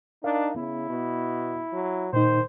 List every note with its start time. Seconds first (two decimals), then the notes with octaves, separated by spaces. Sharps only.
0.24 D4 D#4 A#4 F5
0.56 C#3 B3 E4
0.89 B2
1.73 F#3
2.13 A#2 D#3 D#4 C5